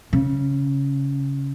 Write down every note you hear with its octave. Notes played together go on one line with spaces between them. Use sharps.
C#3